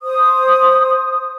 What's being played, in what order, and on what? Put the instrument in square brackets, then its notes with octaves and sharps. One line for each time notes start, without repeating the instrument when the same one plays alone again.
[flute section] C5 D#6